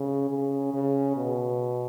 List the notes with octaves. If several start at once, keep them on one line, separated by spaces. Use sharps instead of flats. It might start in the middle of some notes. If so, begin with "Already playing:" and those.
Already playing: C#3
C#3
C#3
B2